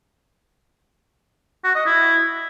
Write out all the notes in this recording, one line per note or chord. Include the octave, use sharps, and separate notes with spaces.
F#4
D#5
E4